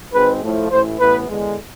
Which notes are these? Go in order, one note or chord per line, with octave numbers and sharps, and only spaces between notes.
G#1 G#2 G#3 C4 B4
A2 F3 A3
A1 A2 E3 C5
A1 A2 E3 B3 B4
E2 D3 G#3